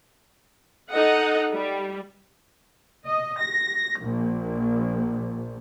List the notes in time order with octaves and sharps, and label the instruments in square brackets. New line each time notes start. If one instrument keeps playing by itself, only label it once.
[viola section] D#4 A4 D#5 F#5
G3
[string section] D#5
A#6
A#1